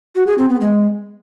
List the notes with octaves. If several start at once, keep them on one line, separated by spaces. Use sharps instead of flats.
F#4
G#4
C4
B3
G#3